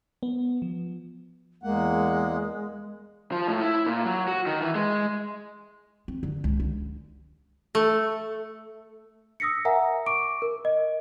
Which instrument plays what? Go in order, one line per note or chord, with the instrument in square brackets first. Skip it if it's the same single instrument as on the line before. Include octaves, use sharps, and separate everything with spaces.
[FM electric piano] B3
F3
[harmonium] E2 A#3 F#5 [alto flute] G#3
[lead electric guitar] F3
A2
E4
A#2
F#3
F#4
D#3
E3
G#3
[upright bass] C4
D3
C#2
D3
[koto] A3
[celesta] D#6 E6 A#6 B6 C#7
A#4 E5 F#5 G#5 A#5
C#6 D6 D7
A#4
D#5